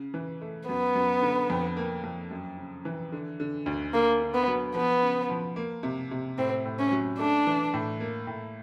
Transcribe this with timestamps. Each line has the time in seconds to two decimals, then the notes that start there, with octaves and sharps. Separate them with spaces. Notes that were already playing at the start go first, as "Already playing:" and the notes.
Already playing: C#3
0.14 E3
0.41 A3
0.68 F#2 B3
0.95 F#2
1.22 D3
1.50 F2
1.77 A#3
2.04 F2
2.31 F#2
2.57 C#3
2.85 E3
3.12 D3
3.40 D3
3.66 D2
3.93 D3 A#3
4.21 D3
4.34 B3
4.47 F#3
4.75 F3 B3
5.02 C#3
5.30 F3
5.56 A#3
5.83 C3
6.11 C3
6.38 A2 C4
6.65 A2
6.79 C#4
6.91 F#3
7.19 A3 D4
7.47 E3
7.74 A2
8.00 A#3
8.27 A2